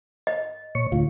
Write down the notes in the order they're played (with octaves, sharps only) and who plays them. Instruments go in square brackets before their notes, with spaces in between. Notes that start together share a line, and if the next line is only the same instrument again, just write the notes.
[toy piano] D#5
[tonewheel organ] A#2 C#5 C#6
[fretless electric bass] D2 A2 [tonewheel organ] F4